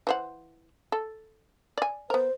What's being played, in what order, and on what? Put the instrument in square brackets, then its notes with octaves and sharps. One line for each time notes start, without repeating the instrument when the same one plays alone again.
[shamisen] E3 C5 F#5
A4
D5 G#5
[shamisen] B3 A#4 [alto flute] C5